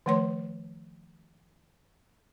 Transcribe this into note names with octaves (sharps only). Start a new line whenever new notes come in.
D#3 F3 A3 C#5 C6